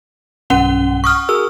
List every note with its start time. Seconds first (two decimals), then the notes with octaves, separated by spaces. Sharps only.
0.50 B1 G2 C#4 F#5 G7
1.04 C#6 D#6 F6
1.29 F#4 G#4 A#4 E6